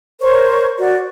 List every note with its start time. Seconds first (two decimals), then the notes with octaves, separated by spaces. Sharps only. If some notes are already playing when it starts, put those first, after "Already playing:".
0.20 A#4 C5 C#5 C#6
0.78 F#4 D5